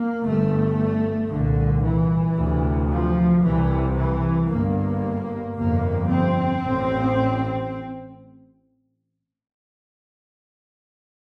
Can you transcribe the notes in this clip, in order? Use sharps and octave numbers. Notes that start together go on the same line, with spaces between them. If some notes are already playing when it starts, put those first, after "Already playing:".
Already playing: A#3
G1 G2 A3
C2 A#2 D3
E3
D2 C3
F3
C2 C3 E3
E3
G1 G2 A#3
G1 F2 C3 A#3
C4
A1 A2